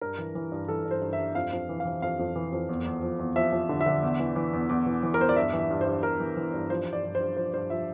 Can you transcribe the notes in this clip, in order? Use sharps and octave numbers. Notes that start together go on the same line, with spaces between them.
G2 A#4
E3
E3
G2
E3 A4
G2
C5
G2
E5
G2
F2 F5
F2
E3
F5
E3
F2 F5
F2
E3
F2
E2
E2
F3
E2
F3 E5
F3
D3
E5
D3
E2
E3
E3
E2
E2
E3
E3
A#4
E2 C5
D5
G2 E5
E3
E5
G2
C5
G2
G2 A#4
E3
E3
G2
F3 C5
G2
D5
G2
C5
G2
F3 C5
G2 C5
F3 E5